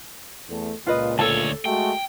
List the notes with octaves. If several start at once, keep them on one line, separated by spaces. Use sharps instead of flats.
E2 A3
C#2 A#2 F4 B4 D#5
D2 A4 C#5 A5
G#3 A3 F#4 G5